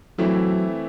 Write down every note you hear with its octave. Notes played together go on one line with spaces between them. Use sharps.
E3 F#3 A3 C4 E4